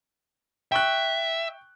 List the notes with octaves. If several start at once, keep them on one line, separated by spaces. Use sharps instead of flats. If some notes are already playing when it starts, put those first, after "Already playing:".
E5 G5 C#6 F#6